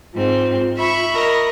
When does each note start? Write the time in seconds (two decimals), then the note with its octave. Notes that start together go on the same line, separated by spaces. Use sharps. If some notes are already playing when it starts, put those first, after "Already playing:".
0.13 G#2 C4 F4
0.77 E5 B5 C#6
1.14 A#4 D#5